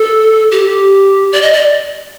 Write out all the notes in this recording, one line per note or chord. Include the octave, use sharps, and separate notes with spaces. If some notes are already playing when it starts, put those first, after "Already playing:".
Already playing: A4
G4
D5
D#5
D5